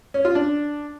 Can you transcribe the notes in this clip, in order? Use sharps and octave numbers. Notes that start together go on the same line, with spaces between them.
C#4
F4
D4